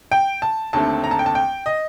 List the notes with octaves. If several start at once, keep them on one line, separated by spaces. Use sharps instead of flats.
G5
A5
D#2 D3 A3 C4 A5
A#5
A5
G5
A5
G5
D#5